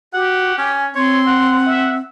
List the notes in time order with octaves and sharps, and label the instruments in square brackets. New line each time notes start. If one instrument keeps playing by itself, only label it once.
[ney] F#4 [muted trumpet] G4 [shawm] F#5
[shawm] C#4 [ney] G#5
[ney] C4 [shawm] C#5 [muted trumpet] C6
[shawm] F#5
[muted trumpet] E5